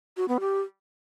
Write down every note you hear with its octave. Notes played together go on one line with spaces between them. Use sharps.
F#4
B3
G4